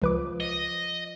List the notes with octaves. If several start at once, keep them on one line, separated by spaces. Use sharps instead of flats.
C#2 F3 B4 D6
D#5